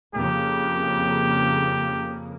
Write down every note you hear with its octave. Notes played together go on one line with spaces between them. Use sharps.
F2 C#3 A#3 G4